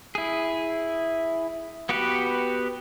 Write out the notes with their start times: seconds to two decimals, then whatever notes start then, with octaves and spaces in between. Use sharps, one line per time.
0.15 E4 G#4
1.89 B3 F#4 G4 B4